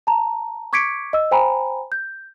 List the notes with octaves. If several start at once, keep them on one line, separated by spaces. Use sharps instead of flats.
A5 A#5
C#6 D6 G#6 B6 C#7 D7
D#5 E6
C5 G5 G#5 A#5 B5
G6